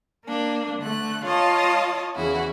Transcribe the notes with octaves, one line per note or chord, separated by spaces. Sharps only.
A#3 D4
D3 A3 F#6
F4 C#5 D#5 F5 A5
E2 C#3 E4 F#4